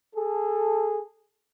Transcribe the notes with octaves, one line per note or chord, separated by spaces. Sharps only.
G#4 A4